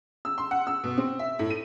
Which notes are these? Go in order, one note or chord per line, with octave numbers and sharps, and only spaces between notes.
E6
C6
F#5
E6
B2
C4
E5
A2
D#7